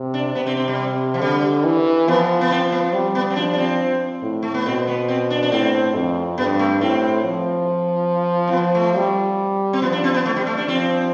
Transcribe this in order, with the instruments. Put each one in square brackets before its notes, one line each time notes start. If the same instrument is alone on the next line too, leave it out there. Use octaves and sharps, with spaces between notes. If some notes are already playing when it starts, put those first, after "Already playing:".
Already playing: [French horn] C3
[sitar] D4
[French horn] C3 [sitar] B3
[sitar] C4
C4
G3
F3
[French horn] D3 [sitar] G3
[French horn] E3
[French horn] F3 [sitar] B3
[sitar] B3
C4
B3
[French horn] G3
[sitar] B3
C4
[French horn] F3 [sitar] D4
[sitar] D4
C4
[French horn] A2
[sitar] A3
B3
[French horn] B2 [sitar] C4
[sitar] B3
C4
D4
D4
[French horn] A2 [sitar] C4
[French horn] F2
[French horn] G2 [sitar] B3
[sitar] A3
[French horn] A2 [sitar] C4
[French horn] F3
[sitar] C4
[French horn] F3 [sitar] B3
[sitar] A3
[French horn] G3
[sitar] C4
[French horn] F3 [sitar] B3
[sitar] D4
C4
B3
A3
G3
A3
D4
[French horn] F3 [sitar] C4